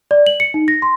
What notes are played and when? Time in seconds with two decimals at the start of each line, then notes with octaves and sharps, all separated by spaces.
0.11 D5
0.27 F#7
0.40 C#7
0.54 D#4
0.68 A#6
0.82 C6